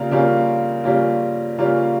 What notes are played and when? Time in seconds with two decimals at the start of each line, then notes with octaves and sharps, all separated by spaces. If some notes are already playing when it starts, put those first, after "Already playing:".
Already playing: C#3 G3 A#3 F4
0.11 C#3 G3 A#3 C#4 F4
0.84 C#3 G3 A#3 C#4 F4
1.58 C#3 G3 A#3 C#4 F4